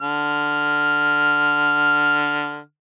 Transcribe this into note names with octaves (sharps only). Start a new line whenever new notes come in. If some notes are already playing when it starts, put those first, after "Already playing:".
D3 F6